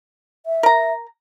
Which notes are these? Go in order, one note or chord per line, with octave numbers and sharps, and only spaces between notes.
E5
A#4 A#5